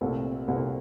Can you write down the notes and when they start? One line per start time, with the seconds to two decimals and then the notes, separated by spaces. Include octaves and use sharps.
0.01 C2 A#2 A3 C4
0.48 C2 A#2 A3 C4